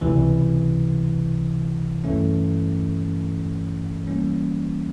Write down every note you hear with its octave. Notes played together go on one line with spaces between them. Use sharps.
C#2 C3 E3
G2 E3 A3 C#4
E3 G3 A#3 C#4